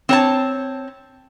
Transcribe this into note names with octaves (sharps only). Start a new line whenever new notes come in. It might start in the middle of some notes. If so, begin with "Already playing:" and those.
C4 C#5 A5